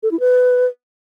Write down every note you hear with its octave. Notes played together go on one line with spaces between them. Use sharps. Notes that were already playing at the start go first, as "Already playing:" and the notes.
A4
E4
B4